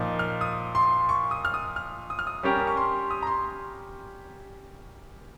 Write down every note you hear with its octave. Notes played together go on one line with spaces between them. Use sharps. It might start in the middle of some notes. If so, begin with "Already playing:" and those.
Already playing: A#2 F3 A#3 D#4
F6
D#6
C6
C#6
D#6
F6
D#6
F6
D#6
F6
D#6
G3 C#4 G4 A#4 C#6
C#6
C6
D#6
A#5
C6